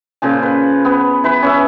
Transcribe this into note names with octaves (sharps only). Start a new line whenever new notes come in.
A#2 C#3 F3 G#5
B4
B3
E3 B4
C#4 B4 E5